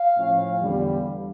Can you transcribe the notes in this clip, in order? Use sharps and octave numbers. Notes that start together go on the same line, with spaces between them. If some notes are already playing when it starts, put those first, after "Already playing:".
Already playing: F5
A2 F3 C#4
E2 D3 G3